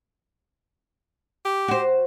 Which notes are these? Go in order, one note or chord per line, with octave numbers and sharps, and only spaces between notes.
G4
F#4 C5